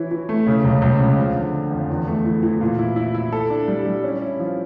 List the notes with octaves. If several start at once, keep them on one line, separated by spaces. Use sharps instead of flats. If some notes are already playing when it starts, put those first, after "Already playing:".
Already playing: E3 E4 C#5
E3
A3
C#3
C#2
C#2
C#2
F3
D3
D3
F2
E2
A3
E3
E3
A#2
E4
E4
E4
A4
D4
G3
G3
C#4
E4
F3